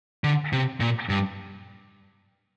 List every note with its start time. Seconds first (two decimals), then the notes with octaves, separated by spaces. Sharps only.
0.24 D3
0.53 C3
0.80 A#2
1.09 G2